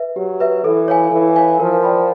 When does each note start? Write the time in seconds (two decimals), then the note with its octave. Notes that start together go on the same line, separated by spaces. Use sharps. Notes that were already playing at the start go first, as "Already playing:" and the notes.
Already playing: B4 E5
0.16 F#3 G4
0.40 B4 E5
0.64 E3 A4
0.88 C#5 F5 G#5
1.11 E3 A4
1.36 C#5 F5 G#5
1.60 F3 A#4
1.83 D5 G5 B5